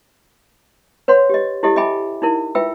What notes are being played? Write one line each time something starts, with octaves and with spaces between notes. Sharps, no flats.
B4 C#5 F#5 C6
G4 D#5
E4 G4 A4 D#5
D#5 E5 G5 G#5 B5 D6
D#4 E4 A#4
F4 B4 E5 G5 E6